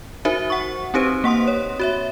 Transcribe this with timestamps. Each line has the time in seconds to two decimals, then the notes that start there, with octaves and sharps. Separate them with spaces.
0.25 D#4 F#4 A#4 C5 E5
0.50 F#5 C#6
0.94 C4 D#4 G4 B4 C5
1.24 A#3 F#5 C6 D#6
1.48 C#5
1.80 F#4 C#5 E5